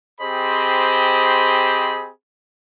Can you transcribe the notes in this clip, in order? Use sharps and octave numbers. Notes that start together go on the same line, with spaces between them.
C4 G4 G#4 C5 D#5 B5